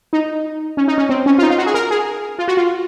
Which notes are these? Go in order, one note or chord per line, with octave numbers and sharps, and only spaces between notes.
D#4
C#4
D#4
C#4
C4
C#4
F4
D#4
F4
F#4
G#4
A#4
G#4
F4
F#4
F4